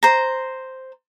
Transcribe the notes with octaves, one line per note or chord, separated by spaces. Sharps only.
C5 A#5